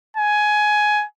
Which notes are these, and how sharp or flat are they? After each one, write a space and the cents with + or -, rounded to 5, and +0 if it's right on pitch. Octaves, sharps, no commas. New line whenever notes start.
G#5 +15